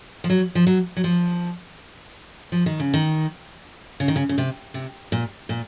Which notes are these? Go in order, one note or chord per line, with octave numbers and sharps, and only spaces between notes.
F3
F#3
F3
F#3
F#3
F3
F3
D#3
C#3
D#3
C#3
D#3
C#3
C#3
C3
C3
A#2
A#2